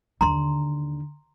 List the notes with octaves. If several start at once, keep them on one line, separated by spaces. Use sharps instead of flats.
D#2 D3 A#5 C6